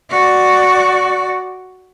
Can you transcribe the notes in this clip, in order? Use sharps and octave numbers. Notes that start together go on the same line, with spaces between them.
F#4 D5